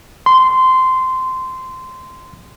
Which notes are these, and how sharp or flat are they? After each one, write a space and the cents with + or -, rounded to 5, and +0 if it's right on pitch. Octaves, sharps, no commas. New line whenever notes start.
C6 -15